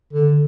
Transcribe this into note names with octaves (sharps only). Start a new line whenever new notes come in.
D3